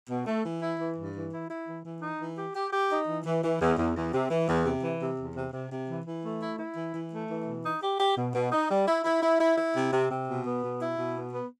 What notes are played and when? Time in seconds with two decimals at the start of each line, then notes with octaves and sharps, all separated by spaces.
0.09 B2
0.26 A3
0.44 E3
0.62 E4
0.79 E3
0.97 G2
1.15 E3
1.32 E4
1.50 E4
1.67 E3
1.85 E3
2.02 D#4
2.20 E3
2.37 G4
2.55 G4
2.72 G4
2.90 D#4
3.08 E3
3.25 E3
3.43 E3
3.60 E2
3.78 E2
3.96 E2
4.13 C3
4.30 E3
4.48 E2
4.66 C3
4.83 E3
5.01 C3
5.19 E2
5.36 C3
5.53 C3
5.71 C3
5.89 E3
6.06 E3
6.23 A3
6.41 E4
6.59 E4
6.76 E3
6.94 E3
7.12 A3
7.29 E3
7.46 B2
7.64 D#4
7.82 G4
7.99 G4
8.17 B2
8.34 B2
8.52 D#4
8.70 G3
8.88 E4
9.05 E4
9.22 E4
9.40 E4
9.57 E4
9.75 C3
9.92 C3
10.11 C3
10.28 B2
10.45 B3
10.63 B2
10.81 E4
10.98 B2
11.15 B3
11.33 B3